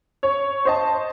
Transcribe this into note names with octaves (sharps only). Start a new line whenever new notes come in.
C#5
C5 D#5 A5